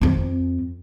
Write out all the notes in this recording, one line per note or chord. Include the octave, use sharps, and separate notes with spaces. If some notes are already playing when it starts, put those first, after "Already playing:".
F2 C4